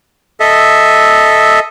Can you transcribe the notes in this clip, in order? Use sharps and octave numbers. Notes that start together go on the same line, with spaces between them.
A4 D#5 E5